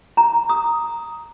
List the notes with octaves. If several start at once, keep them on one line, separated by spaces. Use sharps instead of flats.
A#5
D#6